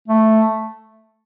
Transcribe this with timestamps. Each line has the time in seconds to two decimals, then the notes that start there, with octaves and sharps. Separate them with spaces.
0.08 A3